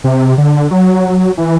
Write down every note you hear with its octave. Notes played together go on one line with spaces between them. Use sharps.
C3
D3
F#3
E3